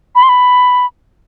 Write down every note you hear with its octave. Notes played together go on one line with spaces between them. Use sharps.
B5
C6
B5